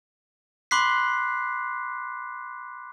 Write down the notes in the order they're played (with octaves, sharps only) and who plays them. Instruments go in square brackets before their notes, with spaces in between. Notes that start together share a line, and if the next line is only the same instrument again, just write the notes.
[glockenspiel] B5 C6 D6 F#6 B6 C7